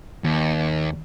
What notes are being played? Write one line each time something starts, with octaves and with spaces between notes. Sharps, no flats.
D#2